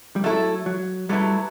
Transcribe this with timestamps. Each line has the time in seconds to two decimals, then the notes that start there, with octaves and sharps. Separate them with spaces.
0.16 G3
0.24 F#3 A3 E4 A4
0.66 F#3
1.09 F#3 G3 A3 E4 B4